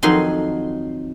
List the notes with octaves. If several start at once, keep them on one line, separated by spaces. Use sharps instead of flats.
F2 D#3 F#3 D#4 F#4 C6